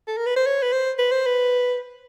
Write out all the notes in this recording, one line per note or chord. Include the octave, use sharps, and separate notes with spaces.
A4
A#4
B4
C5
C#5
B4
C5
B4
C5
B4